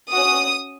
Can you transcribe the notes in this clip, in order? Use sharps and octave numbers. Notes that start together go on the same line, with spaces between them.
C#4 F#4 D#6